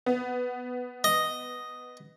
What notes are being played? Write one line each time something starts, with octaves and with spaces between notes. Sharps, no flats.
B3
D#5